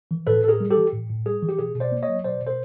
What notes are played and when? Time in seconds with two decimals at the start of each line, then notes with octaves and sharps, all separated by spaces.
0.11 E3
0.27 A2 A4 B4
0.44 A2 A4
0.48 G#4 A#4
0.60 G3
0.70 G4 A4
0.77 E3
0.92 A2
1.10 A2
1.26 G3 G#4
1.42 E3
1.49 G4
1.59 B2 G#4
1.75 B2
1.80 C5 D5
1.92 A#3
2.02 C#5 D#5
2.09 F#3
2.24 B2 C5 D5
2.42 B2
2.47 A#4 C5